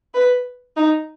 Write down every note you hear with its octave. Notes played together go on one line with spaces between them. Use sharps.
B4
D#4